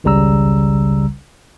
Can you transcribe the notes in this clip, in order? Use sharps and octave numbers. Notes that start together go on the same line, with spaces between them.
G#1 C#2 C#3 G3 A#5 E6